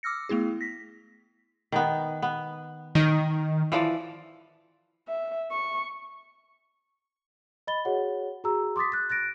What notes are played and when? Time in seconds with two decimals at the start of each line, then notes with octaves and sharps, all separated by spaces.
0.03 D6 E6 F6 A#6 C#7
0.29 A3 B3 E4 G#4
0.61 A#6 B6
1.72 D#3 B3
2.22 B3
2.95 D#3 D#5
3.72 E3 F3 D5
5.08 E5
5.51 C#6
7.67 D#5 B5 A6 G7
7.85 F#4 G#4 C#5 F#5
8.44 F#4 G#4 A#5 E6
8.76 C6 D6 D#6 A6 B6
8.92 F#6 A6
9.10 F#6 A6 A#6 D7